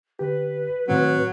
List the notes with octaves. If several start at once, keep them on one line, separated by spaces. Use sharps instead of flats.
D3 G4 B4
A2 D#3 F#3 C4